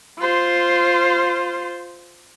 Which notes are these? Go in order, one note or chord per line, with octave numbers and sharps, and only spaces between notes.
F4 C5